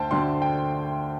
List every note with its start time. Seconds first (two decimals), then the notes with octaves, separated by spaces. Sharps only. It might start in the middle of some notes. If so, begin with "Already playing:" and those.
Already playing: D2 D3 C5 G5 A5
0.11 D2 D3 A3 C6
0.42 G5